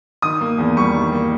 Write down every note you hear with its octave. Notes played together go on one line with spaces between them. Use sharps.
D#3 D#6
A#3
E2
G3 C#6
D#3
A#3